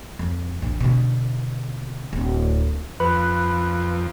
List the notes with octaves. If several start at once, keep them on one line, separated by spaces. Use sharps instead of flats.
F2
A#1 E2
B2 D3
D1
F2 B4 B5 F#6